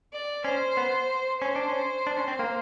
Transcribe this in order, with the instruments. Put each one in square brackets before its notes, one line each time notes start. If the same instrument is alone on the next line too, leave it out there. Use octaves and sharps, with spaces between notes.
[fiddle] D5
[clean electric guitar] C#4 [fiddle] C5
[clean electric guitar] B3
[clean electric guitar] C#4 [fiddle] C5
[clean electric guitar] D4
C#4
D4
C#4
C4
A#3